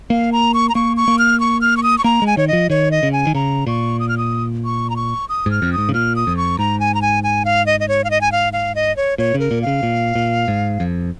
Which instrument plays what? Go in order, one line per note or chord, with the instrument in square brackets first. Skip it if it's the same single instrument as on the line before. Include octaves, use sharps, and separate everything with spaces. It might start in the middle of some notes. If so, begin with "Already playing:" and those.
[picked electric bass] A#3 [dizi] F5
[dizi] A#5
C#6
A#5
[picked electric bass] A#3 [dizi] C#6
[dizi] C#6
[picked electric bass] A#3
[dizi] F6
C#6
F6
C#6
D#6
C#6
[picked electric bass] A#3 [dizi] A#5
[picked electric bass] G#3
[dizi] G#5
[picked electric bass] D#3 [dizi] C#5
[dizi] D#5
[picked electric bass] F3
[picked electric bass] D#3 [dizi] C#5
[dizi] D#5
[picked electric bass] C#3
[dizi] G#5
[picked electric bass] D#3
[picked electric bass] C#3 [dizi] A#5
[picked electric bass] A#2 [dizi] C#6
[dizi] D#6
F6
D#6
C#6
A#5
C#6
D#6
[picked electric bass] G#2 [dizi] F6
[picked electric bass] F2
[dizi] D#6
[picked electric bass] G#2
C#3
[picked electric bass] A#2 [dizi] F6
[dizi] D#6
[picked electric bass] F2
[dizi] C#6
[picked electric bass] G#2 [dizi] A#5
[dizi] G#5
A#5
G#5
G#5
F5
D#5
D#5
C#5
F5
D#5
G#5
F5
F5
D#5
C#5
[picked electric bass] A#2 [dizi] C#5
[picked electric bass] C#3
[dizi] A#4
[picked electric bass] A#2
[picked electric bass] C#3 [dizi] F5
[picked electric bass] A#2
A#2
G#2
F2